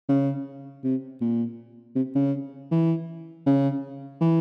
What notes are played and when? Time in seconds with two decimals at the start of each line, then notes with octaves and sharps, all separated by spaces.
0.09 C#3
0.84 C3
1.21 A#2
1.96 C3
2.15 C#3
2.71 E3
3.46 C#3
4.21 E3